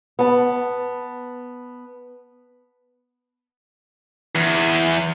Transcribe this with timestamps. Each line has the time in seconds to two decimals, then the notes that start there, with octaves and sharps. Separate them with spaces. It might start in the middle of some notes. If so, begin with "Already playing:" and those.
0.19 B3 A5
4.35 E2